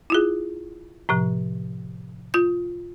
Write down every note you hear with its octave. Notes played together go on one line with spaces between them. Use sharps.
E4 F4 G#4
A2 C3 F3
F4 G6